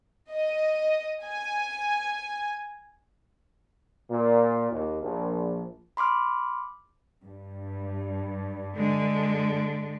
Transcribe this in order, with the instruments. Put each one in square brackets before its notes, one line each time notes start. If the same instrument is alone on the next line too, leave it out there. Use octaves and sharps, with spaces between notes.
[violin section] D#5
G#5
[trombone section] A#2
D#2
A#1
[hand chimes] B5 C6 D6 F6
[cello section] G2
[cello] D3 G#3